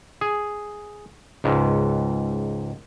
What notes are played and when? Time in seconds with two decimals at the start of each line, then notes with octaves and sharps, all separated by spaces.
0.21 G#4
1.44 C#2 G#2